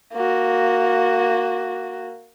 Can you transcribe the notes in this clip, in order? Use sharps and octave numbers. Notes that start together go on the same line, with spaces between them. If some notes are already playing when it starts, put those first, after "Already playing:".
A#3 F#4